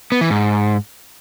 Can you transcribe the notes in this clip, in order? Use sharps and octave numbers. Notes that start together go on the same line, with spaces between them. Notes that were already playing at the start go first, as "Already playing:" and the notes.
B3
E3
G#2